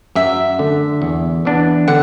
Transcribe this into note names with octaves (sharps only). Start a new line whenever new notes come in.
F#2 E5
D3 A3
E2
E3 B3 D4
D3 F#5